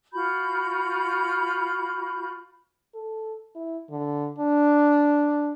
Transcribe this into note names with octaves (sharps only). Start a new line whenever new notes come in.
F4 F#4 B5 G6
A4
E4
D3
D4